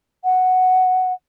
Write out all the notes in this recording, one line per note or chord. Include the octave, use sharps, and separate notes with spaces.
F#5